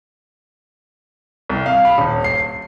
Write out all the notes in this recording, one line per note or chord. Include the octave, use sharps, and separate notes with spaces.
C2
F5
B5
D#1
C7